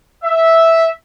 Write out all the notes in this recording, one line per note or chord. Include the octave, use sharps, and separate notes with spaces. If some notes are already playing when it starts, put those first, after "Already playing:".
E5